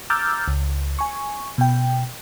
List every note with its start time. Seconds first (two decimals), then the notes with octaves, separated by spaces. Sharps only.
0.10 A#5 D6 E6 F6 G6 A6
0.48 C#2
0.99 G#5 C#6
1.58 B2 G5